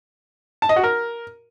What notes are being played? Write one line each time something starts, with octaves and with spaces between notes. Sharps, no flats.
A5
D#5
F#4
A#4